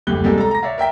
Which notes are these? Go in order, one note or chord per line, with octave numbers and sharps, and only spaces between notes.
F#1 D2 G4 F#6 G7
C3 G3 G#3 A#3 G4 A4
A4 A#5
A#5 A#6
C#5 D5 E5 F5
A#4 E5 G5 B6